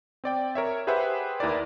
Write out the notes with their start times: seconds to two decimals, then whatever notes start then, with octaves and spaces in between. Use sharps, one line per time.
0.24 C4 D5 G5
0.55 A#4 C#5 E5
0.87 G4 G#4 B4 C5 E5 F#5
1.40 D#2 E4 A#4 B4 D5